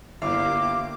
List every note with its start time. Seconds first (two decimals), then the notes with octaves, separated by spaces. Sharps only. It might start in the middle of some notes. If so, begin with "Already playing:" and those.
0.22 G1 A#3 E4 G4 F5 D6